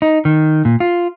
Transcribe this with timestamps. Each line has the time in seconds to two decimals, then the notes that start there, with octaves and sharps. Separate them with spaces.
0.02 D#4
0.25 D#3
0.65 A#2
0.80 F4